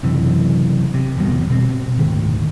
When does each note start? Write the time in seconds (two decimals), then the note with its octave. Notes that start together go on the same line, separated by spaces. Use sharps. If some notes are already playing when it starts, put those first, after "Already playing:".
0.03 F#1 F#2 C3 E3
0.94 C3
1.17 G1 E2 B2 G3
1.50 B2 C4
1.98 D#1 G#1 D2 D#3